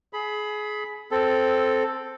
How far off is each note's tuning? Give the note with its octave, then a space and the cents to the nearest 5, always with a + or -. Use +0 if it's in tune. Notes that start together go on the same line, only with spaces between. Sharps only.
G#4 +25 B5 +0
C4 +0 A4 +0